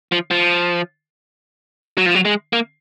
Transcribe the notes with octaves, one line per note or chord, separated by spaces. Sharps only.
F3
F3
F#3
F3
F#3
G#3
A#3